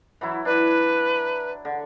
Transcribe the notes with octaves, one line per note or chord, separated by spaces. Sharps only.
E3 F#3 E4
D4 B4
D3